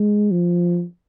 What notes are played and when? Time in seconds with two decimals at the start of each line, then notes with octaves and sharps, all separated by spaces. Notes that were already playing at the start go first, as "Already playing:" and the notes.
Already playing: G#3
0.31 F3